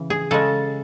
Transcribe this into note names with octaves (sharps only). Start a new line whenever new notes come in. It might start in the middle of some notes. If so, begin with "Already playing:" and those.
Already playing: C#3 E3
G#4
C#3 G#3 A4